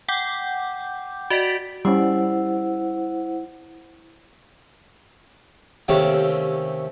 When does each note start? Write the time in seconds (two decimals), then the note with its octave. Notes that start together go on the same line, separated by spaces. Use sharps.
0.08 F#5 G5 D6 G6
1.30 F#4 D5 D#5 A6 B6 D7
1.85 G3 C#4 E4 C5 F#5
5.88 D#2 C3 A3 C#4 G4 G5